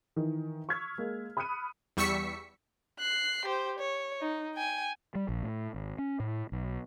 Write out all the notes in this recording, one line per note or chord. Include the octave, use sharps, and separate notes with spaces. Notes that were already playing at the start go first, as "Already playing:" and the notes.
D#3 E3
C#6 E6 F6 G#6 B6
G#3 A#3
B5 D#6 F6 F#6 C#7 D#7
E2 G3 C#6 E6 B6 C#7
F#6 C7
G4 C5
C#5
D#4
G5 G#5
G3
A#1
A2
G#1
C#4
A2
B1